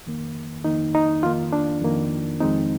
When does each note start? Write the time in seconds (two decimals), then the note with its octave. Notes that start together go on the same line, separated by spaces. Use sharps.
0.06 F2 D#3 A#3
0.64 F2 D#3 A#3 D#4
0.95 D#4
1.23 F2 D#3 A#3 F4
1.53 D4
1.82 F2 D#3 A#3
2.41 F2 D#3 G#3 C4 D#4